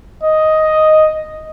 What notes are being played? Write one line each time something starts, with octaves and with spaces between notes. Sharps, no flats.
D#5